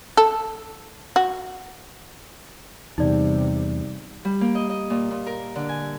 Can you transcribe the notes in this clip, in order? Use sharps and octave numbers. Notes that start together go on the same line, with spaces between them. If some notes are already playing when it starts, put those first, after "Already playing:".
A4
F#4
E2 C3 G3 D#4 D5
G3
A#3
D#5
D#5
A#2
A#2
A#4
D3
G#5